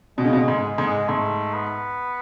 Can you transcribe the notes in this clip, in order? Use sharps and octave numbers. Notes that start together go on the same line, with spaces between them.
B2 G#3
C#3
B2
G#3
G#2
G#3
G#2
G#3
G#2 A3
B3